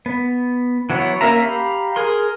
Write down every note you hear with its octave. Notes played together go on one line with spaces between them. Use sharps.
B3
E3 F#3 B3 C#5
A#3 C#4 A#4 E5 A#5
G4 F5 A#5 B5
G#4 A#4 C6